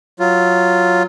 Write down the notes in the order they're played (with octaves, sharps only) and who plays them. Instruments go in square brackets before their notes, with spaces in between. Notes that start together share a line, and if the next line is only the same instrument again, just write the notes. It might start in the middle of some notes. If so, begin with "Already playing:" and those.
[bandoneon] F#3 F4